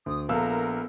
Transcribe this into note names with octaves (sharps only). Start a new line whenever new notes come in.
D2 D#6
A#1 B3 A4 A#4 F5 E6